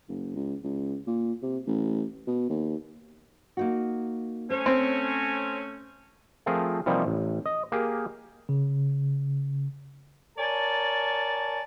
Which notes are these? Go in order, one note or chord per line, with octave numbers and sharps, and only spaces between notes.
F#1
C#2
C#2
A#2
C3
A1
B2
D#2
A#3 D#4 F#4
A3 C#4 C5
C4
F3 A3 C4 F4 G#4 A#4
C3 E3 F3 G3 A#3 D#4
A1
D#5
A#3 G4 G#4 A#4
C#3
A#4 C#5 D5 G#5 A5